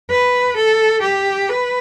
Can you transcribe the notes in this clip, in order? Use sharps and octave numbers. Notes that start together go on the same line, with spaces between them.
B4
A4
G4
B4